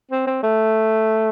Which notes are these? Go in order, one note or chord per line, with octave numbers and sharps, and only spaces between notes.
C4
C4
A3